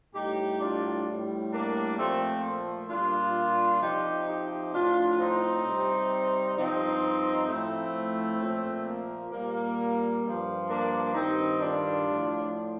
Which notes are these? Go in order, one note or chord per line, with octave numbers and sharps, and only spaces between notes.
A2 G3 D#4 G4
D4 F4
A2 G3
A#3 D4
A#2 F3 A3 C4
A3
A#2 G3 D4 F4
C3 F3 D#4 G4
D#4 G4
A2 F3 D4 F4
C4 D#4
C3 G3
G2 F3 C4 D#4
A2 F3 A3 C4
A#2 F3
A#3
A#2 G3 A#3
G2 F3
A#3 D4
G2 D#3 G3 C4 D#4
D4 F4
A2
F3